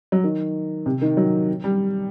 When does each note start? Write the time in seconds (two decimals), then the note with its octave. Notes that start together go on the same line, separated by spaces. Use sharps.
0.12 F#3
0.24 D#3
0.86 C3
1.02 D#3
1.17 F#3
1.64 G3